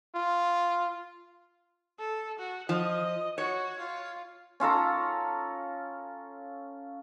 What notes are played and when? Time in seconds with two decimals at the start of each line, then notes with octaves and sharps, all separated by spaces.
0.15 F4
1.99 A4
2.39 F#4
2.69 F3 D#5
3.38 F#4 C#5
3.79 F4
4.60 C#4 F4 A4 A#5